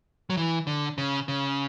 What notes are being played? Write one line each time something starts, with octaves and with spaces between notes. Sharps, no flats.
F#3
E3
D3
C#3
C#3